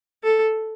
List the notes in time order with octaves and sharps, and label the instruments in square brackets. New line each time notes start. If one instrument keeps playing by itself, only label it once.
[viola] A4